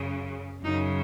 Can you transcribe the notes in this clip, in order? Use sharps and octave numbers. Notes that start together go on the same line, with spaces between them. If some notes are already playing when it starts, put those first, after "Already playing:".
Already playing: F#2 C#3
F#2 C#3 D#4